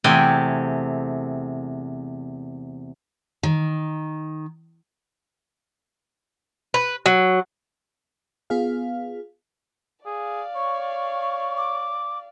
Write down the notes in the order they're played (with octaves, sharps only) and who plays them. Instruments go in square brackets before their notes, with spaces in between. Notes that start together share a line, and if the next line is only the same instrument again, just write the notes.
[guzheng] E2 C3 A3 G5 G#5
[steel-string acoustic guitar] D#3
[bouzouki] B4
F#3
[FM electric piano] B3 F4 G#4 F5
[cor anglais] G#4 [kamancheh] D5 F5
[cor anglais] C#5 [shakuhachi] C#6
[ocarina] D6